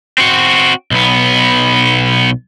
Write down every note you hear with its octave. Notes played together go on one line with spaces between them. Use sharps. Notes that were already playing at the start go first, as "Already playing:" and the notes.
C4 F#4
B1 B3